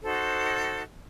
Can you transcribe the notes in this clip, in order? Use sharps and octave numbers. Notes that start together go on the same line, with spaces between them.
D#4 F#4 A4 C5